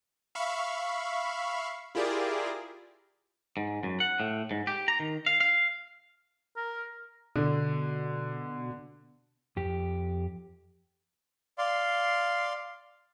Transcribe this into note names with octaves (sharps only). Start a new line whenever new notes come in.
E5 F5 B5 C#6
E4 F4 G4 G#4 A#4 D5
G#2
F#2
F#5
A2
G#2
G4
A#5
D#3
F5
F5
A#4
B2 D3
F2 G4
D5 F5 C6